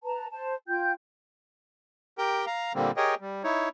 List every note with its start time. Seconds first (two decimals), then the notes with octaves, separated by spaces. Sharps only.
0.04 B4 A5 A#5
0.31 C5 A5
0.68 F4 G5 G6
2.18 G4 A#4 G5 G6
2.46 F5 A#5
2.75 A#2 D3 G3 A#3 C4
2.97 G4 G#4 A#4 C#5 D#5 G5
3.21 G3
3.44 D#4 E4 C#5